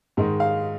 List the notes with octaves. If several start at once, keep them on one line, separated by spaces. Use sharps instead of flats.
G#2 D#3 G#3
F5